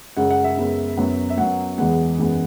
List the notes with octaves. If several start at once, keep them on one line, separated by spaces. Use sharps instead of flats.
F#2 C#3 G#3 F#5
F#5
E5
F#2 C#3 G#3 B3
F#2 F#3 B3
E5
F#2 F#3 B3 F#5
E2 E3 G#3 B3 F#5
F#2 E3 G#3 B3